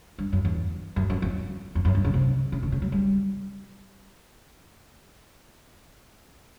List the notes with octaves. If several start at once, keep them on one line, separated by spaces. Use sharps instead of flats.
G2
F#2
E2
F#2
F#2
F2
F2
F#2
G2
C#3
C3
C#3
D3
C#3
F#3
G3